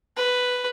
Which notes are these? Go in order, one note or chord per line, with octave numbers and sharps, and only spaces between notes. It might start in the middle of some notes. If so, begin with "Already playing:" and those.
B4